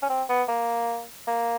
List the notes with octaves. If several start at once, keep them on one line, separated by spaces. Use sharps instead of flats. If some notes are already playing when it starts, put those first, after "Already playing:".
C#4
C4
B3
A#3
A#3